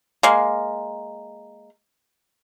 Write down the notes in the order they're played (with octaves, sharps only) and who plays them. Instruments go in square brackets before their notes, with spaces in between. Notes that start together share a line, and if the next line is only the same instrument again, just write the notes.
[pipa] G#3 A#3